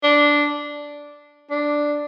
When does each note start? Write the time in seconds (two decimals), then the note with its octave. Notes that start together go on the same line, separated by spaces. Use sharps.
0.03 D4
1.50 D4